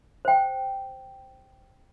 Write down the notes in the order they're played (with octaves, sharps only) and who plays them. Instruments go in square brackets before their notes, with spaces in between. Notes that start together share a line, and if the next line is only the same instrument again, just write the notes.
[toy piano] C5 G5